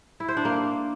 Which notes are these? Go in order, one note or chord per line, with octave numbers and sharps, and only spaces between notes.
E4
C5
D4
A#3